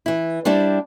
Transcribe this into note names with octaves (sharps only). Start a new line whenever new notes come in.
E3 E4
G3 D4 E4 G4 C5